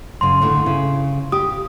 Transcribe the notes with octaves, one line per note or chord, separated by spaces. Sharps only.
F#2 C#3 C6
D2 A2 D3
C#3
G4 D#6